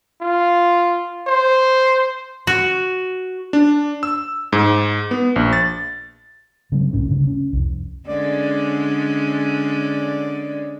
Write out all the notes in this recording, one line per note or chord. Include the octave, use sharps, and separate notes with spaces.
F4
C5
F#4
D4
E6
G#2
B3
A#1
A6
C#3 F#3 G#3 C4
C2 A2 C#4
D2 G2 C#3
C#4
C2 F2
D3 G#3 C#4 D5